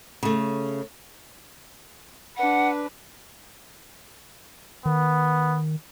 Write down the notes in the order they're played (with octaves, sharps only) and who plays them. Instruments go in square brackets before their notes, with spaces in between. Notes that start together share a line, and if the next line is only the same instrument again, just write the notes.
[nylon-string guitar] C#3 A3
[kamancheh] D4 B4 [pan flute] F#5
[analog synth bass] D#3 [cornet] B3